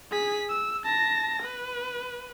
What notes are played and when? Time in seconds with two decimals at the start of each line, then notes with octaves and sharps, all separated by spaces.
0.11 G#4 B6
0.49 E6
0.84 A5 A#6
1.43 B4